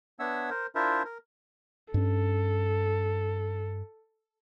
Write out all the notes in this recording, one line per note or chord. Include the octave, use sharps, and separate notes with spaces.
B3 D4 C#5 E5 F#5 E6
A#4 C5
D4 E4 F4 A#4 C5 E5
A#4
G2 C#4 A4